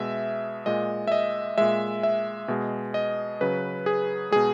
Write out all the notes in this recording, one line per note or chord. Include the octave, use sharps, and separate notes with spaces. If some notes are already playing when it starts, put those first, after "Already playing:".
Already playing: B2 G#3 E5
A#2 G#3 D#5
E5
D#5
A#2 G#3 E5
E5
B2 G#3
D#5
C#3 F#3 B4
G#4
B2 G#3 G#4